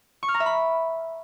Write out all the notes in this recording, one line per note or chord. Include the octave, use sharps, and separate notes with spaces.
C#6
F6
A#5
E5
B5